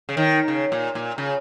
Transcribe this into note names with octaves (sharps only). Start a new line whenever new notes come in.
C#3
D#3
C#3
A#2
A#2
C#3